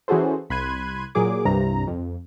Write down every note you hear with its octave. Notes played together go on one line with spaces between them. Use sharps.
E3 C#4 F#4 G#4 A4 C5
C2 B5 C6 F#6 G#6 D#7
A#2 F#3 G#4 D6
C2 G2 C3 A#5
F2